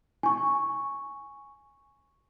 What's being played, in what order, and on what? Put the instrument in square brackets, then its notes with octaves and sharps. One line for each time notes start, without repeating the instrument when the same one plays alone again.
[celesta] G#5 C#6